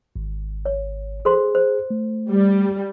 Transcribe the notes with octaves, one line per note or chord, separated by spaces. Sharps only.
G#1
C#5
G#4 A4 C5 C6
C5
A3
G3